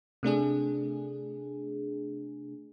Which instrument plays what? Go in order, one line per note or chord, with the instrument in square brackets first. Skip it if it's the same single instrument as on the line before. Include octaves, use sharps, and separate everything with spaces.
[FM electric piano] C3 A3 D4 G#4